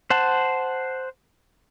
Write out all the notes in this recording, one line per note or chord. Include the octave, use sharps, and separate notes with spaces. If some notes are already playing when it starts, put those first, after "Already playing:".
C5 F#5 A5